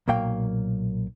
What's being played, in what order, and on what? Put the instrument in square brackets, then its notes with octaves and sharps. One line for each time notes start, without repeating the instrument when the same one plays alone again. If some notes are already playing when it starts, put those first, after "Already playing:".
[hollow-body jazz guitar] B1 A#2 F#3 A#3 F5 G5